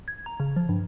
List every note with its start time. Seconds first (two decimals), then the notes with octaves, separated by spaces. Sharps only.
0.08 G#6
0.26 A#5
0.40 C#3
0.56 F3
0.69 G2